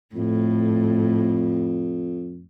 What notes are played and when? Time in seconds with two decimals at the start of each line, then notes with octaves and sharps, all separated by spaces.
0.15 F2 A2